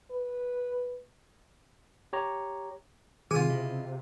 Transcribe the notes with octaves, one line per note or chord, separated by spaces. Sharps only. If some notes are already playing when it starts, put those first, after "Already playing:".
B4
G4 C#5 A#5
C3 D#3 F4 G#4 G#5
C#3 E4 D#5